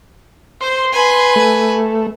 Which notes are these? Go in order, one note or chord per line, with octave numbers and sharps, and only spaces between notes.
C5 C6
B4 G#5
A3